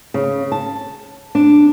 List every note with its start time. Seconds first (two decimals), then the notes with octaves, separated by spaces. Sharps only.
0.14 C#3
0.52 A5
1.35 D4